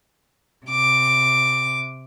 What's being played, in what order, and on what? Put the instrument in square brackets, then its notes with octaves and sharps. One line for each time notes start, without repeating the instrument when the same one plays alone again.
[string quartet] C3 D6